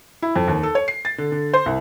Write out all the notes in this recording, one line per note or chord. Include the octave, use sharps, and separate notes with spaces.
E4
F2
D#2
A4
C#5
C7
A6
D3
D3
C5
C2